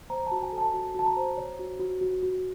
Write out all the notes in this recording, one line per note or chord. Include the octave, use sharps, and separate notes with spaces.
C5 A#5
F#4 A5
G#5
A4
A5
F#4
F#4 A5
A#5
C5
C#5
F#4
F#4
F#4
F#4